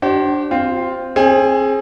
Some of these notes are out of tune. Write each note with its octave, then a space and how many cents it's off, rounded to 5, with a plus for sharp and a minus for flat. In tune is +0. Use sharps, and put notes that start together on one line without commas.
D4 +0 G4 -45 C5 +25
C4 +0 F4 +0
C4 +35 G#4 +10